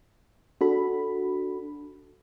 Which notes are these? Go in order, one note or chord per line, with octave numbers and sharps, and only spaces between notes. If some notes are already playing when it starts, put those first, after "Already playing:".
D4 F#4 A4 B5